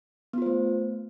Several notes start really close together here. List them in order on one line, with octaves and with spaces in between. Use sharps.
B3 F4 C5 A3